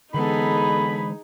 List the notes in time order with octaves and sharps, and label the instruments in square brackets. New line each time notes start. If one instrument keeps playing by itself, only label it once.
[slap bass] D3 E3 G#3 [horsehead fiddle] B3 A4 [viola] D#4 G#4 [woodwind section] B5